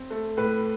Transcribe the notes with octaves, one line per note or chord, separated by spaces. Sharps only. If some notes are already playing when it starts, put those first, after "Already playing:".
Already playing: C4
A3
A2 B4